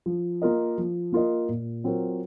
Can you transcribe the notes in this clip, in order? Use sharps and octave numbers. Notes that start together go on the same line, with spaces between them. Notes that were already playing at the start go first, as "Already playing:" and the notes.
F3
A#3 F4 A#4 D#5
F3
A#3 F4 A#4 D#5
A#2
F#3 C4 F4 A#4